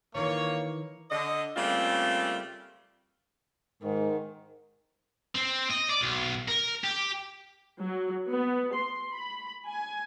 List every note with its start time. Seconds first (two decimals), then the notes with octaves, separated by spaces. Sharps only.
0.15 D#3 E3 A#3 F4 A#4 C#5
1.10 D3 D#5
1.55 C#3 G3 A3 A#3 C4 F4
3.83 G#2 D#3
5.35 C4
5.70 D#5
5.90 D5
6.01 B1
6.48 A#4
6.84 G4
7.79 F#3
8.29 B3
8.72 C6
9.15 B5
9.67 G#5